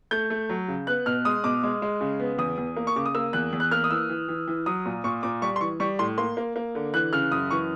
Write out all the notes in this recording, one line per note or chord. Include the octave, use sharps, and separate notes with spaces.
A3 G6
A3
F#3
C#3
B3 F#6
B2 F6
G#3 D#6
B2 D6
G#3
G#3
C#3
B3
E2 D#6
E2
A#3
C#6
C#3 D6
D#6
A#3 E6
E2 F#6
E2
F#6
A#3 F6
D#6
E3 E6
E3
E3
E3
F#3 D#6
A#2
A#2 C#6
A#2 D6
G3 C#6
C6
E3 C#6
G3 C#6
A2 C6
A#3 C6
A#3
A#3
D3
E3 F#6
C#3 F6
F#2 D#6
E3 C#6